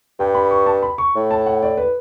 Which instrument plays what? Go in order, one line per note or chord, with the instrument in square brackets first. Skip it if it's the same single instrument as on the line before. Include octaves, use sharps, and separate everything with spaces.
[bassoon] G2 [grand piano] G5
[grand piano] B5
C#6
A5
B5
C#6
[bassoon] A2
[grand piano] A5
F#5
D5
B4